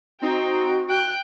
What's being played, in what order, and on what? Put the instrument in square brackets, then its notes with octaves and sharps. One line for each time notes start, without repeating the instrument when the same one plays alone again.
[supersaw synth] C4 D#4 [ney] F#4 [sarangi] G5
[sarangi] G5 [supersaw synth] F#6